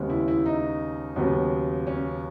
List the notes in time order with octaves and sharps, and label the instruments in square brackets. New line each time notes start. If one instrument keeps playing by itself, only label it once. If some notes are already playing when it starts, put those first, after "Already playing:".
Already playing: [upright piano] D#2 C#3 G#3 B3
E4
E4
D#4
D#2 C#3 F#3 B3
C#4